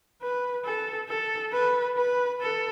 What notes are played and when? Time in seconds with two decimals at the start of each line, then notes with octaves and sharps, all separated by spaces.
0.22 B4
0.65 A4
1.09 A4
1.53 B4
1.97 B4
2.41 A4